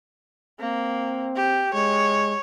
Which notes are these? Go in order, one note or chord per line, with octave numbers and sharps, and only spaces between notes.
A#3 C4
G4
G#3 C#5